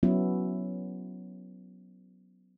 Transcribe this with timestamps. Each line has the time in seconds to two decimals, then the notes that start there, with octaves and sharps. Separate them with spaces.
0.03 F#3 B3 C#4 E4